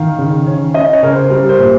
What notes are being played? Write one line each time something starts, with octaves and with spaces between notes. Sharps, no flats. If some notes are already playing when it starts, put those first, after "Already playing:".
Already playing: D#3 F5
C#3
C#4
C#4 D#5
C#5
C#3 A#4
C5
G3 A#4
C5
A#2